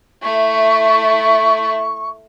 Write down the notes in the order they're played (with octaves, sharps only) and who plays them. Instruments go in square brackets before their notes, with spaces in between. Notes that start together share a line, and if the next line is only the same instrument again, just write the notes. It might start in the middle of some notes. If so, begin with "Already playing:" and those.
[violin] A3 E4 [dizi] C#6